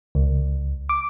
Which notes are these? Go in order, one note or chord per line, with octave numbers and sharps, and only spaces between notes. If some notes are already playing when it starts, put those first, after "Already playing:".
C#2
D6